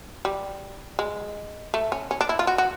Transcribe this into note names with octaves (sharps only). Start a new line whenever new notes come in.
G3
G#3
A3
C#4
C#4
D4
E4
F4
F#4
F#4